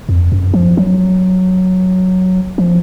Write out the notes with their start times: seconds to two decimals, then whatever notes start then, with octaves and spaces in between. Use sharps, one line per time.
0.09 F2
0.32 F#2
0.54 F3
0.77 F#3
2.58 F3